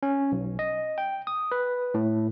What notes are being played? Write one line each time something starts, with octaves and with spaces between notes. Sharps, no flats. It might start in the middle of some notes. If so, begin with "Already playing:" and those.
C#4
B1
D#5
G5
D#6
B4
A2